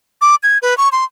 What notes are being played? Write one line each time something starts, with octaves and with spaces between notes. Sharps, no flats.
D6
G#6
B4
C#6
C6